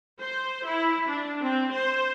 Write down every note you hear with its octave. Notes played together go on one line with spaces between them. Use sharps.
C5
E4
D4
C4
C5